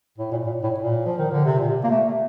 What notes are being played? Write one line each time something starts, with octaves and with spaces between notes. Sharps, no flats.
A2
A#2
A#2
A2
A#2
F3
D#3
D3
C3
A#2
A#3
A3